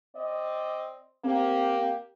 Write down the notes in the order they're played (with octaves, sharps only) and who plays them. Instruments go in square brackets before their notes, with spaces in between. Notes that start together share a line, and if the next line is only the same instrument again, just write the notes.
[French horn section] C4 D5 D#5
[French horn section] A#3 G4 [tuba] C4